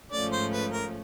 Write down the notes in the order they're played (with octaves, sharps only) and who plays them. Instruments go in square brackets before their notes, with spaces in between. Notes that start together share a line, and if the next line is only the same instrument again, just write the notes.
[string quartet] G#2 F3 A3 C#4 [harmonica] D5
[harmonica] C5
B4
A#4